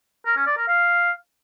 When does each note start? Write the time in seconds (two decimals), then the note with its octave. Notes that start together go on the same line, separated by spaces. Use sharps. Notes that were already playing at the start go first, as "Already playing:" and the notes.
0.26 A#4
0.36 C#4
0.47 D5
0.57 A#4
0.68 F5